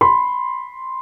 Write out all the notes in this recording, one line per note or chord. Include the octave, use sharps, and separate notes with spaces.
B5 C6